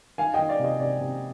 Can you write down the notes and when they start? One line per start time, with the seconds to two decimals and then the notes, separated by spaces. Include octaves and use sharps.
0.18 D#3 F5 G#5
0.34 D#3 D#5 G5
0.49 D5 F5
0.59 C3
0.64 D#5
0.79 C3 D5
1.00 C3